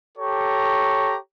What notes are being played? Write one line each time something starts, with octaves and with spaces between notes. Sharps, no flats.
G4 A4 C#5 A#5 C#6